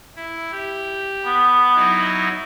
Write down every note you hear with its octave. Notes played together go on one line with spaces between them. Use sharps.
E4
G4
B3
F#3 D#4 E4